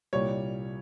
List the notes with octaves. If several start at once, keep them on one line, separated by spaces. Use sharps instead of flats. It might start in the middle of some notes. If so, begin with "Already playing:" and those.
C2 A#2 G3 C#5